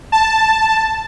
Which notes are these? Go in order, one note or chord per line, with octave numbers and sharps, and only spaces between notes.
A5